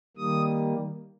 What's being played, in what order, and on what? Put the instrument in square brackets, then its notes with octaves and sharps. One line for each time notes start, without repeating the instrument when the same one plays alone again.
[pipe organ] D#3 G3 A#3 D#6